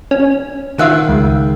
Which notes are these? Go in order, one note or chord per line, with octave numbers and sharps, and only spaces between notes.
C#4
D#3 F4 E5 F#5
C#2